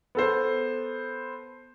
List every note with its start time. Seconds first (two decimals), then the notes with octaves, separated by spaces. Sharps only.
0.15 B3 A4 C5